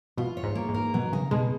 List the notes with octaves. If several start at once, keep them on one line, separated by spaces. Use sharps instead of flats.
B2 F4
C#5
G#2
A#3
G#2
A#4
B2 F#3
C#3 D#4
B2 G#3